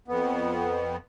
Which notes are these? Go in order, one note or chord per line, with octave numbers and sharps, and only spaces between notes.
F2 B3